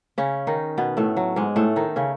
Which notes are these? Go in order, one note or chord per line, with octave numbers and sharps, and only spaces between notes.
C#3 C#4
D#3 D#4
B2 B3
A2 A3
F#3
G#2 G#3
A2 A3
D#3 D#4
C#3 C#4